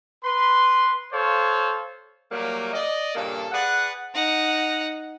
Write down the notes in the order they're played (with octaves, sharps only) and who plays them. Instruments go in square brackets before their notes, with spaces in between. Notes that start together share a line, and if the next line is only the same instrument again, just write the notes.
[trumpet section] B4 C6
A4 C5 C#5 F5
[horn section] F#3 G3 A3 A#3
D5 D#5
G2 A#2 C#3 A#3 A4
G#4 B4 D5 F#5
[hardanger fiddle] D#4 F#5